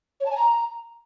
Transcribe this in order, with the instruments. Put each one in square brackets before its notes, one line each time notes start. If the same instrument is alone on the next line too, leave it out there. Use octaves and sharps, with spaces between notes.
[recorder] C#5
A5
G#5
A#5